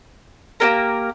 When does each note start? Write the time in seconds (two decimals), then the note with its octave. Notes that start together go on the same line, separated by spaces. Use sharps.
0.60 A#3 C#4 G4 A#4